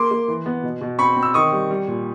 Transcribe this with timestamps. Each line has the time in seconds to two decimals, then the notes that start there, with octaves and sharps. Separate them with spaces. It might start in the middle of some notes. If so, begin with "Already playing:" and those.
Already playing: A#3 C6 D6
0.11 A#3
0.28 E3
0.46 B3
0.63 B2
0.81 B2
0.99 C4 B5 C#6
1.16 C4
1.23 E6
1.34 D#3 C#6 D#6
1.52 G3
1.70 G3
1.88 A#2